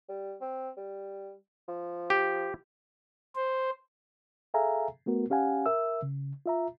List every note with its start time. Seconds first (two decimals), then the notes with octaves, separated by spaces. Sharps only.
0.09 G3
0.41 C4
0.77 G3
1.68 F3
2.10 G4
3.36 C5
4.54 G#4 A4 E5 F5 G#5 A#5
5.06 A3 B3 F#4 A#4
5.30 C#4 G4 F5 F#5 G#5
5.66 A#4 E5 E6
6.02 C#3
6.46 F4 E5 A#5